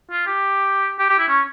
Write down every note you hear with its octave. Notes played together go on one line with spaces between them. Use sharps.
F4
G4
G4
G4
E4
C#4